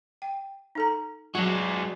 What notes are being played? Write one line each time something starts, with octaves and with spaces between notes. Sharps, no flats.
G5
D#4 A4 A#5
F#3 G#3 D4 F#4